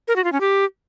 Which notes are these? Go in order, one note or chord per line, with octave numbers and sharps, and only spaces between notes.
A#4
F#4
F4
C#4
G4